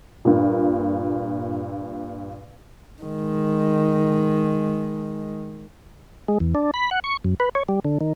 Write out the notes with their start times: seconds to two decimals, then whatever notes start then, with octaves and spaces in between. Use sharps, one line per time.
0.25 G2 A#2
3.02 D#3 G#3
6.28 G#3
6.40 E2
6.55 D4
6.74 B5
6.91 F#5
7.04 C#6
7.24 F#2
7.40 B4
7.55 C#5
7.69 G3
7.85 D3
8.01 D#3